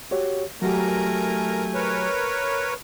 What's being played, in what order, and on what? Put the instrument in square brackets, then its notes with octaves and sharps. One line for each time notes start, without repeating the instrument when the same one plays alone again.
[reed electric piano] F#4 G4 C#5
[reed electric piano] F#3 F#4 G4 [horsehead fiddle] A3 G#5 [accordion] A#4 A#5
[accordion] A#4 B4 C#5